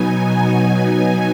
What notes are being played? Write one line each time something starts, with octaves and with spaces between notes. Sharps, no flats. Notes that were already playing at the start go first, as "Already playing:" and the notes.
Already playing: B2 F#3 B3 D#4 G#5